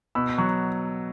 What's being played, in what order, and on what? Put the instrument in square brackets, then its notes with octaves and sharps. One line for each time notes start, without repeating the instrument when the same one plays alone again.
[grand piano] B2 B5 E6
F#3 C#6 F#6